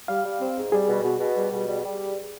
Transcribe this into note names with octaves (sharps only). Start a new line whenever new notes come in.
G3 F5
G3
C4
G#2
G3 G#4
B2
B2
B2
G3
B2
G3
G3